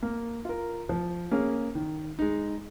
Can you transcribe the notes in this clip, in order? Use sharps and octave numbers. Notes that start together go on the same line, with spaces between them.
A#3
F4 A#4
F3
A#3 C#4 G#4
D#3
G#3 D#4